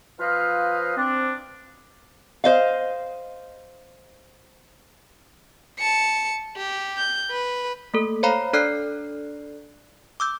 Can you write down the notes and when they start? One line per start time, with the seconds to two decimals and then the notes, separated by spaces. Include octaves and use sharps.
0.20 F3 F4 B4 C5 D#5 F5
0.97 C4 D4
2.44 C5 D#5 F5
5.78 A5 C#7
6.56 G4
6.97 G6
7.30 B4
7.94 A3 A#3 A4
8.23 C5 C#5 F5 A#5 B5 C7
8.53 D4 A4 D5 F6 F#6 C7
10.20 D6 E6 G6